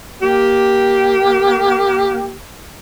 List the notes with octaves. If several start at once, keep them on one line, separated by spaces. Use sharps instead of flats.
A#3 G4